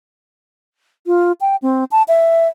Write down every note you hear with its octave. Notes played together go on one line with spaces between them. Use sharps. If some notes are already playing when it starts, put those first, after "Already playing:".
F4
G5
C4
A5
E5